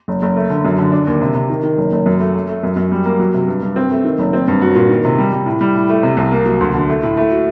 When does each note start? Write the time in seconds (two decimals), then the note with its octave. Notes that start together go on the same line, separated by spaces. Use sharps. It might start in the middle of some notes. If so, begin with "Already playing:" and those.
0.08 F#1
0.22 F#1
0.36 A3
0.50 D3
0.65 F#2
0.78 D3
0.92 D4
1.07 D#2
1.21 C3
1.34 C3
1.50 D#3
1.63 D#3
1.78 F#1
1.92 F#1
2.06 F#2
2.20 A3
2.34 A3
2.48 A3
2.63 F#2
2.76 F#2
2.92 G3
3.05 A#3
3.19 F#3
3.34 C3
3.48 G2
3.63 G2
3.76 C4
3.91 A3
4.05 D#3
4.19 F#1
4.33 C4
4.48 G2
4.62 F#4
4.75 A#2
4.89 D#3
5.05 C3
5.19 G3
5.32 G3
5.46 A2
5.61 G3
5.75 A2
5.89 A3
6.03 C3
6.17 C2
6.31 A#3
6.46 F#3
6.60 D2
6.74 D3
6.89 A3
7.03 A2
7.17 A3
7.30 F#4